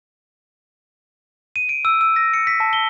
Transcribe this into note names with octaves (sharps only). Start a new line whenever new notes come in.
D#7
D7
E6
E6
A#6
C#7
B6
A5
G7